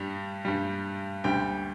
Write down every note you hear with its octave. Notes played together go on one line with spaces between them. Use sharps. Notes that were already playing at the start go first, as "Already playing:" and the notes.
Already playing: G2 G3
G2 G3
D2 D3 G3 G5